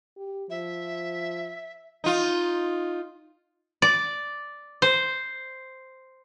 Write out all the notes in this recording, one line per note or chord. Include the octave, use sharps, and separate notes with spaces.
G4
F3 E5
D#4 F4
D5
C5